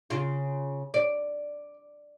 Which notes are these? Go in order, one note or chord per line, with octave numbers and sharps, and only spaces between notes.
C#3 F4
D5